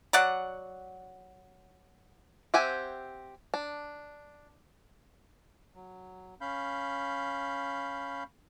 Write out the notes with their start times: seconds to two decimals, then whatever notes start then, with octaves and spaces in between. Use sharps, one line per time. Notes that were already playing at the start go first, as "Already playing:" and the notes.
0.13 F#3 D5 F#5
2.54 C4 G4 E5 F#5 G#5
3.54 D4
5.75 F#3
6.41 C#4 F5 B5 G6